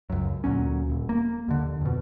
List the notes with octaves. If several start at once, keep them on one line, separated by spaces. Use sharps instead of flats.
C#2 F#2
D2 A#2 F#3 C#4
D#1
A#3
D#2 D3
F2 B2